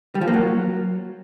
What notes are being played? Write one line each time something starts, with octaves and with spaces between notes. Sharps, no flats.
G3
F3
A#3
F#3